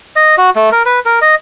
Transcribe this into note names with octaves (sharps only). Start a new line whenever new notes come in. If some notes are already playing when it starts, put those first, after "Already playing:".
D#5
F#4
A3
A#4
B4
A#4
D#5